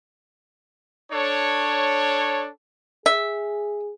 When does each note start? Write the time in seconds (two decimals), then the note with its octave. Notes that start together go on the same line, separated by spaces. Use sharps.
1.11 D4 A4 C#5
3.06 G#4 E5